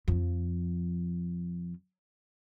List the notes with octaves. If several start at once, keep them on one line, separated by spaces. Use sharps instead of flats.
F2 F3